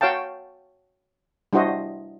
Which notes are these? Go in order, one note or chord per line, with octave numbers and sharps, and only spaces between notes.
F#4 C#5 F5 G5 A5
G3 D4 E4 F#4 C5 D#5